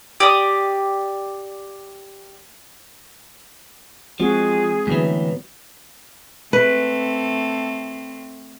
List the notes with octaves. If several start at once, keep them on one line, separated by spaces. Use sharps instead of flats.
G4 D5 D#6
F3 G#3 C4 F#4 G#4
A2 D3 E3 F#3 B3
A3 C4 B4